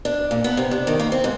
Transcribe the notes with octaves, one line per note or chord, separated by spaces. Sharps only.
D4
A#2
B3
C3
D4
D#3
A#3
C4
G#2